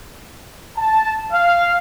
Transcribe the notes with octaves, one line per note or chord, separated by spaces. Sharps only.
A5
F5